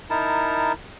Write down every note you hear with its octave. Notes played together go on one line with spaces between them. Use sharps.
D#4 E4 A#4 A5